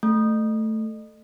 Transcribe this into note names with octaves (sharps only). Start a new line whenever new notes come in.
A3